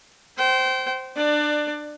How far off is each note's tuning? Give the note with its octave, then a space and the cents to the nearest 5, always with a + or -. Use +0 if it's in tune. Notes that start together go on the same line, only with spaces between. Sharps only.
C5 +0 G5 -30
D4 +25 D5 +15